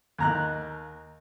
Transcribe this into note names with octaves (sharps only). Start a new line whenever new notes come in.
D#2 A#5 F#6